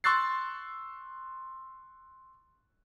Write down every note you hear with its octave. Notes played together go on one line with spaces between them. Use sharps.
C6 C#6 E6 F#6 A6 C7